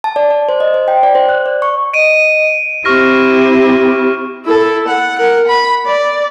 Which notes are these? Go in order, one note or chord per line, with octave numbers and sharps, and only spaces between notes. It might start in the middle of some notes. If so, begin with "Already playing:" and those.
A5
D5
D5
C5
D#5
C5
G5
D5
C5
F#6
D5
C#6
D#5 D7 D#7
C4 E4 G4 C#6 F6 A#6
E4 A4
F#5
A#4 F#5
B5
D5